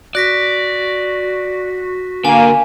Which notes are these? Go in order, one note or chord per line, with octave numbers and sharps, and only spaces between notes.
F#4 D5 F#6 A#6 B6
D3 A#3 G#5